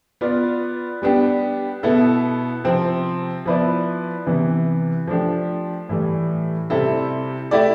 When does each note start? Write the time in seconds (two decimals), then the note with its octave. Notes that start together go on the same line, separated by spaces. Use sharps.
0.21 B3 F4 B4 D5
1.02 G3 B3 D4 G4
1.83 B2 B3 E4 A4
2.64 C3 F3 C4
3.46 F3 B3 E4 B4 D5
4.26 C3 E3 B3
5.07 F3 A3 D4 G4
5.89 A2 E3 G3
6.70 C3 G3 C4 E4 A4
7.51 A3 E4 G4 D5